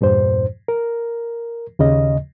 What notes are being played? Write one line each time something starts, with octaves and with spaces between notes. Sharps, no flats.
E2 G2 A#2 C5
A#4
D#2 C#3 D#5